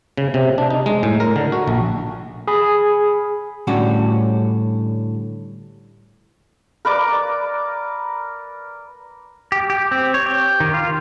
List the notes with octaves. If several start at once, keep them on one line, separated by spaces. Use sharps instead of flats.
C#3
C3
D4
D#4
G#3
A2
A#4
D3
F#4
A#1
G#4 B5
A2 D3 G3 C#4 F#4
A#4 B4 D5 D6
G4
G4
C4
C#5
G4
D#3
F4